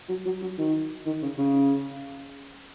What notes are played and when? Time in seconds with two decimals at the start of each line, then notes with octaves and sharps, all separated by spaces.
0.09 F#3
0.26 F#3
0.41 F#3
0.58 D#3
1.06 D#3
1.22 C#3
1.38 C#3